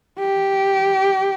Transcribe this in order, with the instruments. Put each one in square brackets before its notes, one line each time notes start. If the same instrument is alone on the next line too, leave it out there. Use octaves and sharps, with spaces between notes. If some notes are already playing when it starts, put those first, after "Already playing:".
[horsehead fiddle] G4